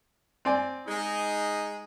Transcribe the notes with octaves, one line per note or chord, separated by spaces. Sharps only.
C4 D5 G#5
G#3 D#4